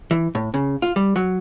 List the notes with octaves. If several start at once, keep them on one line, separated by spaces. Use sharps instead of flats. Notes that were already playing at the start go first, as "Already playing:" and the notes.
E3
A2
C#3
F4
G3
F#3